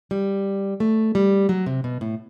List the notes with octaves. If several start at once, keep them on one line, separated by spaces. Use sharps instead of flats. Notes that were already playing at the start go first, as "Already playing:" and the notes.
G3
A3
G3
F#3
C3
B2
A2